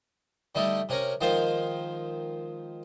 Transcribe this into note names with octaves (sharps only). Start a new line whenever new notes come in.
D3 G3 A3 D#4 E4
C3 C#4 A#4 C#6
D#3 F3 G#3 F4 C5